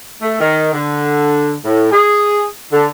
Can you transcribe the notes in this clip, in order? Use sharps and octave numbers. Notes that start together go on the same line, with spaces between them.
A3
D#3
D3
A2
G#4
D3